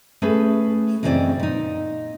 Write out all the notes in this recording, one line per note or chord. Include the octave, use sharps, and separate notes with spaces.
A3 C#4 G#4 A4 B4
F#2 C#3 E3 C4 D5 D#5
A#2 D#4